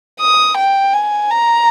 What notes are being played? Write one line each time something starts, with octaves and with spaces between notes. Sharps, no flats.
D#6
G5
G#5
A#5